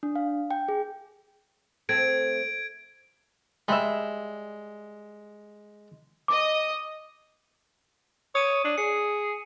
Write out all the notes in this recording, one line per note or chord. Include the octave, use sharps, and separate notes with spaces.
D4
F5
G5
G#4
A3 C4 G#6 D7
G3 G#3 E5
D#5 D6 D#6
C#5 D#6 D#7
D4
G#4 C#7